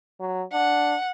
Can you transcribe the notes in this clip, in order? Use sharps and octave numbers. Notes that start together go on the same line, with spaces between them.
F#3
D4 F#5